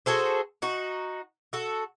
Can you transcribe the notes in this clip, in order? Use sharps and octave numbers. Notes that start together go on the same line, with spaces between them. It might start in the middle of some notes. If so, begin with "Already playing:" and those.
F#4 G#4 A4 C5
D#4 F#4
F#4 A4